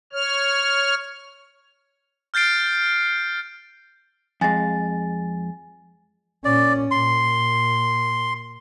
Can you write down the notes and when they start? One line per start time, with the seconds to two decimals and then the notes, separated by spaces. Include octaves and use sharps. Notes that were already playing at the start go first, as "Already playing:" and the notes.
0.13 C#5 F6
2.34 F6 G6 A6 C7 D7
4.41 F2 G#3 G#5 A6
6.45 A#2 C#4 D5
6.91 A#2 C6